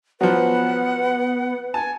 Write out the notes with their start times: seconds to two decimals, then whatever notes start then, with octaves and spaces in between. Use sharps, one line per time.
0.21 F3 F#3 B3 B4 F#5
1.74 G#5 A5